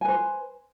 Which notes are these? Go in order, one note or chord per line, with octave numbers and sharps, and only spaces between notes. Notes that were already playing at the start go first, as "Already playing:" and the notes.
B4 C5 G#5